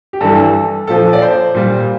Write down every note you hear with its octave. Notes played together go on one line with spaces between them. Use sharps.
G4
G2 E3 G3 A4
A#2 F3 A4
D5
C5
A#2 G3